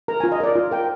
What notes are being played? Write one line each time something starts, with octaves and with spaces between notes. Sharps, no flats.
A#4 A#5
F4 G#5
D#5
A#4 D5
F4
A#4 G5